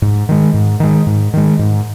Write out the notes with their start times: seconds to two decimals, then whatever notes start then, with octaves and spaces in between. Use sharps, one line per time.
0.02 G#2
0.29 D#3 G#3
0.54 G#2
0.80 D#3 G#3
1.07 G#2
1.33 D#3 G#3
1.59 G#2